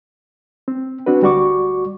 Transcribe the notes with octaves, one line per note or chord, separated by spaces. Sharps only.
C4
C4 D4 F#4 B4
D2 G3 F#4 D5 C#6 D6